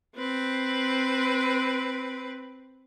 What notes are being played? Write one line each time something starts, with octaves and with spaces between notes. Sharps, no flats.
C4 B4